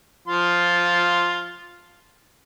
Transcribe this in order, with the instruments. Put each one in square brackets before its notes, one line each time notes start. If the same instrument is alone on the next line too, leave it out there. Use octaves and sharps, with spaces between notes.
[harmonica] F3 F4 C6